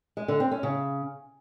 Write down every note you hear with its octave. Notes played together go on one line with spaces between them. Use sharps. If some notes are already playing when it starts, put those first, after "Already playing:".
G#3
D3
C4
C#4
C#3